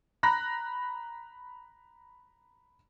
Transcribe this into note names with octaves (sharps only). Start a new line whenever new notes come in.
A#5 B5 F#6 A#6